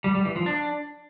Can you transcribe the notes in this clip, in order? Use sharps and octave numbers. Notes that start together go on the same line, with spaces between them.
G3
G3
E3
F3
D4